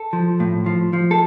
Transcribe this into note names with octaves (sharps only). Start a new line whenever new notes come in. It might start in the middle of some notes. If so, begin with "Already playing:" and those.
Already playing: A4
F3
A2
F3
F3
A4